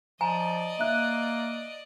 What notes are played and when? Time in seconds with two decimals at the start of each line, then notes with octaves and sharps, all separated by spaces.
0.21 F3 D5 D#5 G#5 A#5
0.79 A#3 E5 F#6